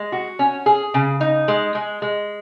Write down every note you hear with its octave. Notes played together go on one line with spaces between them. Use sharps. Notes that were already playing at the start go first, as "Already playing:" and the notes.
Already playing: G#3
F#4
C#4
G#4
C#3
D#4
G#3
G#3
G#3